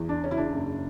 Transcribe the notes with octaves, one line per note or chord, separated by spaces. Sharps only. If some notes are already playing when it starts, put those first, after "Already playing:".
Already playing: E2
D4
C#3 C#4
E4
D4
F#1